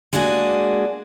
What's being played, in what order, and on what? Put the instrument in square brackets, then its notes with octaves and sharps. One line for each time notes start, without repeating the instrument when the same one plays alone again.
[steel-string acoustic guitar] G#3 A#3 D4 F#4 G#4